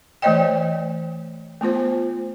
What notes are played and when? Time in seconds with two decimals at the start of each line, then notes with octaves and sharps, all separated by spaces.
0.22 E3 A3 C5 C#5 D#5 G5
1.61 A3 B3 F4 C5